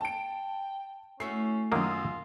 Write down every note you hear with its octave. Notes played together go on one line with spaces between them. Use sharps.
G5 A5 D7
A3 C#4 E4 F#4 C7
F#2 D#3 F#3 A#3 F4 D#6